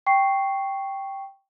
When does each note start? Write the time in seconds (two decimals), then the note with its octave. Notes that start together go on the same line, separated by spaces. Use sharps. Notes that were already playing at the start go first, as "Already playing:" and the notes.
0.06 G5 C#6 C7